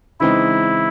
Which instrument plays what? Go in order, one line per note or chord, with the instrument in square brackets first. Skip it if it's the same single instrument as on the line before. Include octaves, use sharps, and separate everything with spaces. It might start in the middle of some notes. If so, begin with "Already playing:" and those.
[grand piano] C#3 E3 G#3 C4 D#4 [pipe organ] E4